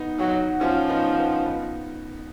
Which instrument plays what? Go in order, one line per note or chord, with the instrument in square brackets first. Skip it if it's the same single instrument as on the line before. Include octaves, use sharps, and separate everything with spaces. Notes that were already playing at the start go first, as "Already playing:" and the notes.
Already playing: [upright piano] B3 D#4
[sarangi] F#3 [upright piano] D#4 F#4
[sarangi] F3 [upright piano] C#4 F4
[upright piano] B3 D#4
B3 D#4
B3 D#4